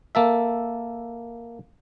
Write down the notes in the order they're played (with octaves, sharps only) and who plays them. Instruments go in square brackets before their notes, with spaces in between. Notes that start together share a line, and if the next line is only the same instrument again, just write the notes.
[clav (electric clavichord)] A#3 A4 E5